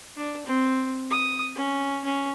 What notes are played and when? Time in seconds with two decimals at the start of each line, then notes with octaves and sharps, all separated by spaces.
0.17 D4
0.46 C4
1.10 D#6
1.56 C#4
2.04 C#4